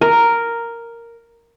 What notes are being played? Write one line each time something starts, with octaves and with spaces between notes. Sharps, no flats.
A#4